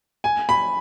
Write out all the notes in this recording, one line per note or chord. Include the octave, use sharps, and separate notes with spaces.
G#5
B5